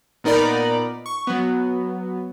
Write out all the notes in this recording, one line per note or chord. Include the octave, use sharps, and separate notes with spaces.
A#2 B3 D#4 A#4 D5 B5
C#6
F#3 B3